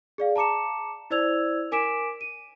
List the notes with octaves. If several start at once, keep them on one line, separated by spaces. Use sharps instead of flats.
G#4 D5 F5
A5 A#5 D6 C#7 E7
E4 C5 D5 E6 G#6 F7
A#4 G#5 D6 B6 D7 E7
D#7